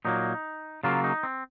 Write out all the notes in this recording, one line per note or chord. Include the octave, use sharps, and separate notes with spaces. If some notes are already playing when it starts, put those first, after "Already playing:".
A#2 F#3 A#3 D#4
C#3 F#3 A#3 F4
D#4
C4